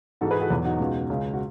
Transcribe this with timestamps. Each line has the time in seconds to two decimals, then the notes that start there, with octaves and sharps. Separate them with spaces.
0.21 G#2 E3 G#3 F#4 A4
0.31 G#4 B4
0.41 F#4 A4
0.50 E2 B2 F#3
0.65 D#4 F#4
0.79 C#2 B2 G#3
1.10 C#2 C#3 G#3
1.33 F#4